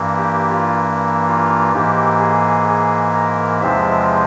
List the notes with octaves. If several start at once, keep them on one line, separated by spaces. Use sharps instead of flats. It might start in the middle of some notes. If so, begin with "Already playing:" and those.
Already playing: G2 E3 A#3
G4
F4
F4
G#2 E3 A#3 G4
G#4
G#4
A#4
E2 C3 F3 G#3 C4 E5